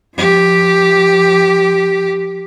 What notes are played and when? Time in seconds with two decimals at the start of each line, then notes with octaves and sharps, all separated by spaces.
0.16 F3 G4